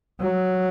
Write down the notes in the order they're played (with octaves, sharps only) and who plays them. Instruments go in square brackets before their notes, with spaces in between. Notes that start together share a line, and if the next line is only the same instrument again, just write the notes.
[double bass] F#3